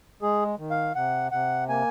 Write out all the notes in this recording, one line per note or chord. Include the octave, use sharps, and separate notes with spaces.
G#3 G#4
D#3
F5
C3 F#5
C3 F#5
A#3 G#5